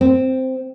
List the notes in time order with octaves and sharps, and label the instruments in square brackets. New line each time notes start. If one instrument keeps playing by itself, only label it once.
[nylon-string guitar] C4